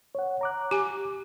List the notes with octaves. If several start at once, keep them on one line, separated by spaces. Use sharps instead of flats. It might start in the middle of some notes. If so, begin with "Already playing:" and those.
C#5 F#5
A#5 D6 F#6
G4 G#5